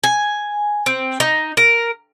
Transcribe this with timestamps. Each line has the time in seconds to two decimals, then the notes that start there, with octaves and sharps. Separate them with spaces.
0.04 G#5
0.86 C4
1.20 D#4
1.57 A#4